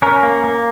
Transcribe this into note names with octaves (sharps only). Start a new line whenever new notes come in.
C#4 A#4
A#3
A#3